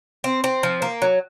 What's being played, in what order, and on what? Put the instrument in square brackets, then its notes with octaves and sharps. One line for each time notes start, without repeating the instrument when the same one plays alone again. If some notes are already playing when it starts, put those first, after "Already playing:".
[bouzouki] C4
C4
F3
A#3
F#3